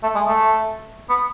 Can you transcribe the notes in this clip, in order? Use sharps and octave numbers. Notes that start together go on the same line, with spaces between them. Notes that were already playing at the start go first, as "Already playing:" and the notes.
A3
G#3
A3
B3